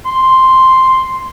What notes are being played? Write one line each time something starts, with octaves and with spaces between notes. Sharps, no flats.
C6